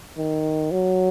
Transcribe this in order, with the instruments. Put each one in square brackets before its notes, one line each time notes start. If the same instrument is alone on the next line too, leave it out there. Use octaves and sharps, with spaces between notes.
[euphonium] D#3
F#3